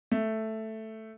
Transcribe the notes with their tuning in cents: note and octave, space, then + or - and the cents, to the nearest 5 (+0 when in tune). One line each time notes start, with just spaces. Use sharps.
A3 +0